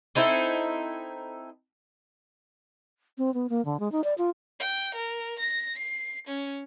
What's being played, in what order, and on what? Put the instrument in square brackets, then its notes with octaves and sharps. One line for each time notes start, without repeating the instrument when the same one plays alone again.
[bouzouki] C4 D#4 E4 A4
[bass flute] C4
B3
A#3
D3
G#3
D#4
D5
F4
[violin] G5
A#4
A#6
C7
C#4